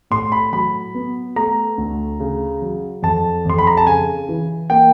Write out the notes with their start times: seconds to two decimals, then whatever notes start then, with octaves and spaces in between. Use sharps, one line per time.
0.11 A2 C6
0.32 B5
0.52 F#3 B5
0.95 B3
1.36 A3 A#5
1.78 D2
2.20 C#3
2.62 F#3
3.02 F2 A5
3.45 F2 C6
3.58 B5
3.67 A#5
3.77 A5
3.87 C#3 G#5
4.29 E3
4.70 A#3 G5